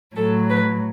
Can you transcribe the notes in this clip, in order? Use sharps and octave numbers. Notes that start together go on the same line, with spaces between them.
A2 F#3 A4
B4